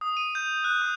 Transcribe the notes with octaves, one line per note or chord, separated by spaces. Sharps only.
D#6
D#7
G6
F#6
D#6